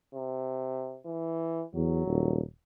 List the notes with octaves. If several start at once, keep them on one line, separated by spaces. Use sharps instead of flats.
C3
E3
E2 F#3
D#1